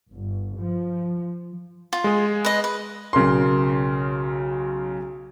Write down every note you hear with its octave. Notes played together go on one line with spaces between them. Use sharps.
G1
F3
F4
G#3 G#4
B4 D#5
B4
B1 C#3 A#4 C6